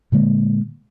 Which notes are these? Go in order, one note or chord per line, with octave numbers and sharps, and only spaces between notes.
A#2 D3 G#3 A#3